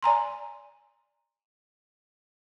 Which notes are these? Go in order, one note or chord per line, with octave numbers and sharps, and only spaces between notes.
D5 G#5 A#5 C6